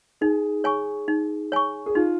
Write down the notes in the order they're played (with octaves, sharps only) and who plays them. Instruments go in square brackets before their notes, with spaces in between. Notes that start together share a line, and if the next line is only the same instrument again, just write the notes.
[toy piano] D#4 [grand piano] G#4
[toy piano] C#5 G#5 C#6
D#4
C#5 G#5 C#6
[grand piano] G#4
[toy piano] D#4 [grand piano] F4